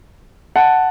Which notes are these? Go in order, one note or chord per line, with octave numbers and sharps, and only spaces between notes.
F#5 A5